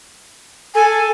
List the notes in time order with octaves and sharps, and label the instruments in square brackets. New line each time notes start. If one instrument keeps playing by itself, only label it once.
[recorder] A4 [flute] G#5